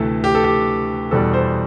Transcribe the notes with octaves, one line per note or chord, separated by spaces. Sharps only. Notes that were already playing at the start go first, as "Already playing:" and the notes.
Already playing: D2 C3 E3 A3 A4 B4
G4
A4
G4
E2 B2 G3 A4
C5